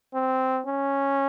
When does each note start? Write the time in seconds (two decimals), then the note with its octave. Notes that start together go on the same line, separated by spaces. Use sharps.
0.14 C4
0.67 C#4